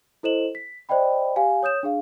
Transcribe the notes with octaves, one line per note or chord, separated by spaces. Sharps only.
E4 A4 C5 D#5 E7 F#7
B6
C5 D5 D#5 G5 B5
G4 F5 G#5
C#5 D#6 G6 E7
D4 G#4 F5